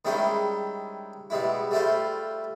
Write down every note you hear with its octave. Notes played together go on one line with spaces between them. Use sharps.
D#3 G3 G#3 C#4 E4 C5
B2 G3 G#3 E4
G3 A3 E4 F4 C5